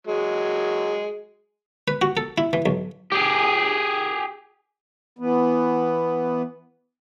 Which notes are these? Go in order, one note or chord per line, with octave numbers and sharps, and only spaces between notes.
F#3 G#3
B4
F#4
A4
E4
E3
B1
G4 G#4
E3 B3